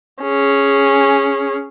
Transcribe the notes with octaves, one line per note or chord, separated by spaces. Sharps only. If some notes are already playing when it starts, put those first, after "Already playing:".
C#4 G#4